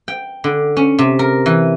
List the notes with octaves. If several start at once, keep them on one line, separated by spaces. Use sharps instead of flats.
G5
D3
C#4
C3
A#4
E3